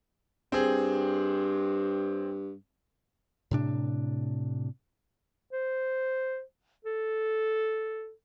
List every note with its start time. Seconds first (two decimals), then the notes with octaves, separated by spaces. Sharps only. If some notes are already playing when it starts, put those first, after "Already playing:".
0.52 G2 C4 G#4
3.51 A2 C3 D4
5.52 C5
6.85 A4